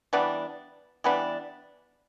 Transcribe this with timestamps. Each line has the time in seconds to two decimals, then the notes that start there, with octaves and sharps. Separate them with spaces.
0.13 E3 G3 B3 D4
1.04 E3 G3 B3 D4